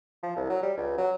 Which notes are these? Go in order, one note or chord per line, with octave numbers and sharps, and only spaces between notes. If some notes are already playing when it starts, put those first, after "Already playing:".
F3
C2
F#3
G3
C#2
F#3